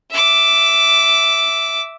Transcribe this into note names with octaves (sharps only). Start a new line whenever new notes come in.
E5 D6